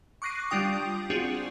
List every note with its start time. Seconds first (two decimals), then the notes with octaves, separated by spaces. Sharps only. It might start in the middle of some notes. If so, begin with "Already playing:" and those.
0.22 C#6 D6 F#6 A#6 C7 D#7
0.50 G3 D4 F4 G5 D#6
1.10 C4 D4 F4 F#4 G#4